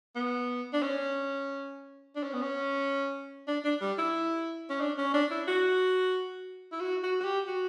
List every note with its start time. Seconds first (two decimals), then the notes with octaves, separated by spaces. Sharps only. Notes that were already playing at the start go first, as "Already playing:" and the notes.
0.16 B3
0.73 D4
0.83 C#4
2.16 D4
2.24 C#4
2.34 B3
2.42 C#4
3.48 D4
3.65 D4
3.81 G3
3.98 E4
4.70 C#4
4.81 D4
4.98 C#4
5.14 D4
5.31 E4
5.48 F#4
6.72 E4
6.81 F#4
7.03 F#4
7.21 F#4
7.24 G4
7.47 F#4